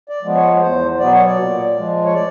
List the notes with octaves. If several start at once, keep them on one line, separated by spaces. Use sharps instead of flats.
D5
F3 G#3 B3
C#5
E2 C5
B2 F#3 B3 D5
C#5
D5
A#2
F3 G#3
C#5
D5